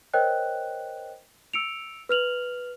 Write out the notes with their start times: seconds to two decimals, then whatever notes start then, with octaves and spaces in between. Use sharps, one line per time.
0.14 A#4 C5 C#5 D#5 G5 F#6
1.54 E6 C#7 D7 F7
2.09 B4 F6 F7 F#7